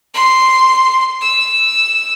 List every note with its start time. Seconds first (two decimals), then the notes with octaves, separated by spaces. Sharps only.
0.14 C6
1.21 E6